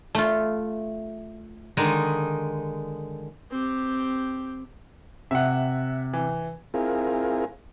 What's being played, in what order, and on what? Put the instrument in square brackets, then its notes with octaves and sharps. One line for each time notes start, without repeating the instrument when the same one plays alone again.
[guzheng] A3 F4
[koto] D3 D#3 G#3 D#4
[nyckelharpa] C4 G4
[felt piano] C3 [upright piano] E5 F#5
[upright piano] E3
[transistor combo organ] C4 E4 F4 G#4 A#4